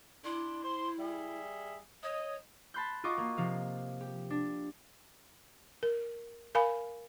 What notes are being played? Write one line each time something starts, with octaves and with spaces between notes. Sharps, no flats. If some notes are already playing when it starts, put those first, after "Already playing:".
D4 E4 D5 C6
C5 C6
G3 G#4 E5
C#5 D#5
A5 B5 C6 F#6 G6
F4 F#4 D#5 C#6 D6
A#3
C3 F3 F5
G4
D4
A#4
A#4 F5 G#5 B5